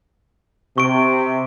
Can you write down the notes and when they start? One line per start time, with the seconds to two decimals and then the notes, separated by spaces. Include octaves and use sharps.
0.78 C3 C#6 D7